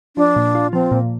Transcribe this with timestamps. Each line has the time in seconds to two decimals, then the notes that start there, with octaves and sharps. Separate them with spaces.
0.17 F3 D4
0.36 A#2
0.55 F4
0.73 F3 C4
0.92 A#2